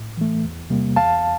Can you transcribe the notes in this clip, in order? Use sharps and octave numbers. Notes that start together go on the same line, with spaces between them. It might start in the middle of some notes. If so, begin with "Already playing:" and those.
Already playing: A2
E3 A3
E2
C3 G3 A#3
E2 F5 A5